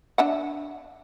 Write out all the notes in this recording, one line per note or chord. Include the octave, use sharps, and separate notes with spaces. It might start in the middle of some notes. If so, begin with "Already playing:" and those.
D4 E5 F#5